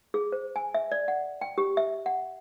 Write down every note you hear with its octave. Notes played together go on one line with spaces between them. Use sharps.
G#4
C5
G#5
E5
D5
F#5
G5
G4
E5
F#5